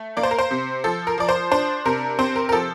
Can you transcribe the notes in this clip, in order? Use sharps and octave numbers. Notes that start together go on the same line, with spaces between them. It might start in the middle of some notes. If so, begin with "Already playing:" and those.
Already playing: A3
A#3 D5
C5
A#4
C5
C3
F3 A4
A#4
F3 D5
C5
D4 C5
C3 A#4
C4 C5
A#4
A#4
F3 A4